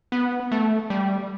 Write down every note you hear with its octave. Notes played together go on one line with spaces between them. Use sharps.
B3
A3
G3